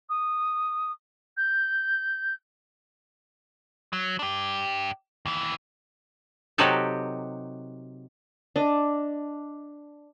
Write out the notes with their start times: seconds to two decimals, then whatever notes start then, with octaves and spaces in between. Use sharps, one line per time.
0.09 D#6
1.37 G6
3.93 F#3
4.19 D4 G4
5.26 D#2 E3
6.58 C3 F#3 D#4 F#4 G4 A4
8.56 D4 D#5